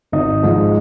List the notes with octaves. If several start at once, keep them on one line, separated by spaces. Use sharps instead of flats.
G#1 D#4
G#2 F3 G#3